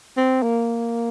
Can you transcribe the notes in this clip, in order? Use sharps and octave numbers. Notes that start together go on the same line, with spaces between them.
C4
A#3